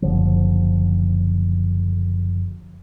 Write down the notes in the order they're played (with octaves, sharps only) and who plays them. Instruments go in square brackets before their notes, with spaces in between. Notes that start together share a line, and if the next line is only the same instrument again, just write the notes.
[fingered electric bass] F#1 D2 D3 F3